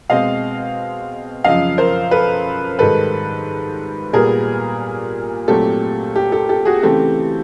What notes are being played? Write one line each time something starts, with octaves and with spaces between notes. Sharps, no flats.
B2 G#3 C4 D#5 F5
F#2 C#3 F3 D#5 F5
A#4 C5
A4 B4
G#2 D#3 G3 A4 B4
A#2 G3 B3 G#4 A#4
A#2 F#3 A3 C4 G4 A4
G4
G4 A4
G4 A4
F#4 G#4
C#3 E3 A3 C4 G4 A4